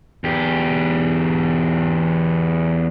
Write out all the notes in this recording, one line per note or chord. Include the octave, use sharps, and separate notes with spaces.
E2 G4